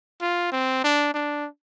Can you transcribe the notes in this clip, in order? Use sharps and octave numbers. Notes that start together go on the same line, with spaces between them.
F4
C4
D4
D4